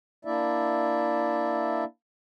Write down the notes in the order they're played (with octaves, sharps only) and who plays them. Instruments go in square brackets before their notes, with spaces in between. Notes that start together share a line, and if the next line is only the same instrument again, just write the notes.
[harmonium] A#3 D4 E4 D5 E5